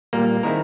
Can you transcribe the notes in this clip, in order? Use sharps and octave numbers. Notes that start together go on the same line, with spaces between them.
A#2 G3 A#3
D#3 G#3 C4 E4 A#4